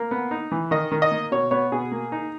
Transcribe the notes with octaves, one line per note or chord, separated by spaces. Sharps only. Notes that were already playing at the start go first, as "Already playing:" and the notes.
Already playing: A#3
B3
D#4
E3
D#3 D#5
D#3
D#5
A#3
B2 C#5
B3 C#5
B2 G#4
A#3
D#4